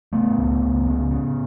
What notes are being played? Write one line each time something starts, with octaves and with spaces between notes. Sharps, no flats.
C#3 A3 B3
C#2
C#2
C#3
C#3